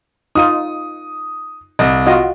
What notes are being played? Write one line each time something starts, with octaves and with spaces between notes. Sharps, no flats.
D#4 F4 D#6 D#7
C2 D#5
F4 F#4 D#5